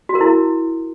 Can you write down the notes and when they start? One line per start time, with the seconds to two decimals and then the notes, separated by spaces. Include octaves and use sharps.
0.09 F#4
0.15 A#4
0.21 E4